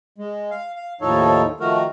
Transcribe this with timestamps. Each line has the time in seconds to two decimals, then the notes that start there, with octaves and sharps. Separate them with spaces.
0.18 G#3
0.51 F5
0.75 F5
1.01 D#2 A2 F3 D#4 A4 C#5
1.60 D#3 F3 A3 F#4 A#4